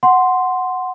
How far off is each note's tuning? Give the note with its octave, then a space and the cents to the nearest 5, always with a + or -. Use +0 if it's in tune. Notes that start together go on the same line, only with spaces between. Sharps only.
F#5 +0 C6 -5